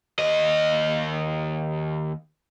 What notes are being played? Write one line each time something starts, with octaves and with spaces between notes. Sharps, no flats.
D#2 D#5